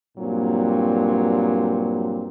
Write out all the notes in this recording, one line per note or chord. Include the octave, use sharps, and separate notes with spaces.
G2 A#2 F#3 C4